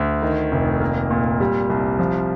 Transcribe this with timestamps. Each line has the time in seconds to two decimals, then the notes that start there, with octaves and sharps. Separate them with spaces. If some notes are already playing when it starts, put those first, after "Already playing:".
Already playing: D2
0.22 D#3
0.52 F1
0.81 A#3
1.11 A#2
1.40 G3
1.70 C2
1.99 F3